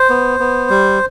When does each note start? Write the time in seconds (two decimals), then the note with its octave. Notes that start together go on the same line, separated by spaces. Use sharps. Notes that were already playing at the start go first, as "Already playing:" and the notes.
Already playing: C5
0.10 B3
0.40 B3
0.70 G3